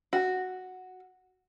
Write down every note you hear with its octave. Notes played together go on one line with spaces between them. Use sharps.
F#4